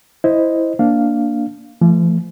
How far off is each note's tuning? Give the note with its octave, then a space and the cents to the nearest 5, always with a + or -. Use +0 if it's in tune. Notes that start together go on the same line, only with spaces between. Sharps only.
E4 +0 C5 -5 D#5 +0
A#3 +0 D4 -5 F5 +0
F3 -40 A3 +0